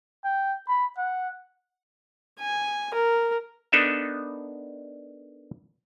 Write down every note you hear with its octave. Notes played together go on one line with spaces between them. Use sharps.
G5
B5
F#5
G#5
A#4
B3 D4 D#4 A4 A#4 E5